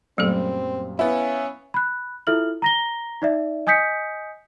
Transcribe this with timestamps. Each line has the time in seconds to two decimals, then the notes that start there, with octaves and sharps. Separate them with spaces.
0.18 F#2 A#2 F#3 G3 A3 C4 A4
0.99 B3 C#4 E4 F5
1.74 B5 F#6
2.27 E4 F4 A4 E5 F6 F#7
2.62 A#5 A#6 G7
3.22 D#4 D5 E5
3.67 D#5 G#5 D#6 G6 B6 C#7